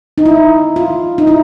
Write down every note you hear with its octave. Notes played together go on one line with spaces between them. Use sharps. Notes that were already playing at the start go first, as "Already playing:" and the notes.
D#4
E4
F4
D#4
E4